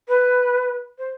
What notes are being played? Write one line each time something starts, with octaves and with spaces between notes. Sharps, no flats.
B4
C5